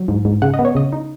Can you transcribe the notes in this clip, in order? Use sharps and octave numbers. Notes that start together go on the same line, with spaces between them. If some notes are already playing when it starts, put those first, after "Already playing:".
Already playing: F#3
G#2
G#2
C#3 F#5
D#5
B3
C#5
C#3 D#5
D#4